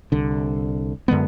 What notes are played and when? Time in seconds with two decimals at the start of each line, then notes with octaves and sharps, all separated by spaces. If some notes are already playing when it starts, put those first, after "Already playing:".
0.12 C2 D3
1.08 F#2 D3 G#3 B3